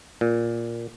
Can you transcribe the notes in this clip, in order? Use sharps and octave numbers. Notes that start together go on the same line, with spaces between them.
A#2